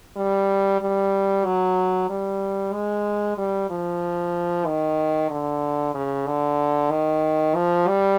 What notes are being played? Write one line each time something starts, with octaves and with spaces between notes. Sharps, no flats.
G3
G3
F#3
G3
G#3
G3
F3
D#3
D3
C#3
D3
D#3
F3
G3